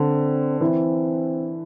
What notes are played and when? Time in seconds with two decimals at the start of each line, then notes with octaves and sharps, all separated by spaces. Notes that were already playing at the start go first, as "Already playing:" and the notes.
Already playing: D3 C4
0.61 E3 C4